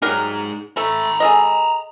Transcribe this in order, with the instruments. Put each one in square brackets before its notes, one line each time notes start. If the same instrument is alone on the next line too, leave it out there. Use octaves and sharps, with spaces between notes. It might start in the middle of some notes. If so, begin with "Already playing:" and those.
[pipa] F#3 G3 A#4 [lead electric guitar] D#4 G#4
[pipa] A3 A4 [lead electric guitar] A#5 B5
[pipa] G#4 A4 D#5